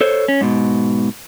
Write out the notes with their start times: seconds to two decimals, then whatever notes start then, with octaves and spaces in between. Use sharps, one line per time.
0.01 A4 C5 C#5
0.28 C#4
0.41 G#2 B2